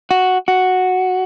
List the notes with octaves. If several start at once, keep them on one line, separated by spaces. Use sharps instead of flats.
F#4
F#4